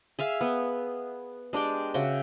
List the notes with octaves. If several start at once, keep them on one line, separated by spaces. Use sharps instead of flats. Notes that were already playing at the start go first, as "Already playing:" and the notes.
G#4 E5 F5
B3
G#3 D4 G4 G5
C#3 F#4 E5 G5